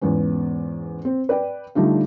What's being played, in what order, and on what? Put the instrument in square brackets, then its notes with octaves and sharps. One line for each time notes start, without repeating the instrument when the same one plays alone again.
[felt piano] E2 G#2 B3 C#4
C4
B4 D5 G5
D3 G3 A3 D#4 F4